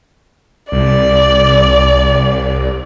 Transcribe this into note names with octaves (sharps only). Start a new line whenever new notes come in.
C2 D5